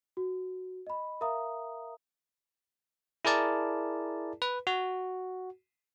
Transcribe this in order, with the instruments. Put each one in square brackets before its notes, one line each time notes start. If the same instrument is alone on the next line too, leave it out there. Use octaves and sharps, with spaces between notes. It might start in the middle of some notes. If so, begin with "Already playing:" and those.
[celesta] F#4
D#5 B5
A#4 E5 F5 A#5 D#6
[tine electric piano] E4 G#4 A#4 D5 A5
B4
F#4